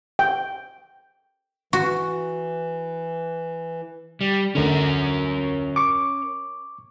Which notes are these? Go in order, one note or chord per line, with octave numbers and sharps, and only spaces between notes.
G5
E3 F#4
G3
D2 D3 C#4 A#4
C#6 D6